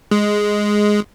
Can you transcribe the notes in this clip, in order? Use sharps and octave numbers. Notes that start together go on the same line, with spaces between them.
G#3